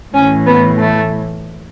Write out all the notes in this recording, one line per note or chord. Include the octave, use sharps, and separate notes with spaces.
A2 E3 C#4
B3
A3